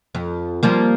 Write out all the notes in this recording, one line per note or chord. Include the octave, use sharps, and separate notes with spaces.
F2
F3 G3 A#3